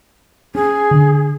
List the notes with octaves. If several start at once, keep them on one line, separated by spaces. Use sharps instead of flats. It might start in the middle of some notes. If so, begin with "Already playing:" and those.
C#4 G#4
D3